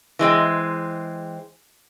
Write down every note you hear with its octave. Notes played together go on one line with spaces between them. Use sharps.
E3 G#3 C4